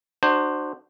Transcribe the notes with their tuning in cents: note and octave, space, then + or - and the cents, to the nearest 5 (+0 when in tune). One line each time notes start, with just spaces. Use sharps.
D4 +30 F#4 +5 C5 +0